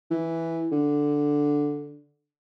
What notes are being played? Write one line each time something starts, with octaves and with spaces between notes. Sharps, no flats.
E3
D3